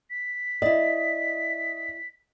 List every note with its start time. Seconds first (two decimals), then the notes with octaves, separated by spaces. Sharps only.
0.10 B6
0.62 E4 D5 D#5